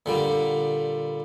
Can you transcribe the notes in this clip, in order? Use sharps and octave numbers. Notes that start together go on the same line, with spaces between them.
A#2 D3 G3